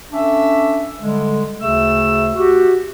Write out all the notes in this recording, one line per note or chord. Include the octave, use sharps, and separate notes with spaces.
C#4 D4 A4 E5
D3 G3 G#3
D2 C#3 A3 E6
F#4 G4